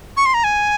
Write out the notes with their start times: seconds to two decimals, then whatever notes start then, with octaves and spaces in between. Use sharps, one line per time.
0.17 C#6
0.26 C6
0.34 A#5
0.44 G#5